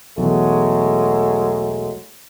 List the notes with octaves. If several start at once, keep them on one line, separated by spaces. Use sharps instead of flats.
B1 E2 F#3 G#3 A3